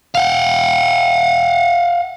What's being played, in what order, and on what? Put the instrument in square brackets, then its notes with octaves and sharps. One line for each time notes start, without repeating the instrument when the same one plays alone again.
[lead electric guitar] F5 F#5